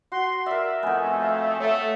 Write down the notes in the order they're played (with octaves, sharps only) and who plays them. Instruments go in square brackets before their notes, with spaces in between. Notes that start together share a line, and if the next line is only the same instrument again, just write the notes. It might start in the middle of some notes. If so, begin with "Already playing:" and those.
[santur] F#4 [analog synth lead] C6
[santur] A#4 D5 [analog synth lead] E5
[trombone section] F2 A3 [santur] B3 D#4 [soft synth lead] G#5
[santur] F5
[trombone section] A3 [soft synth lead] C#5